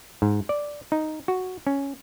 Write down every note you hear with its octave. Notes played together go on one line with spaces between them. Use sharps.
G#2
D5
D#4
F#4
C#4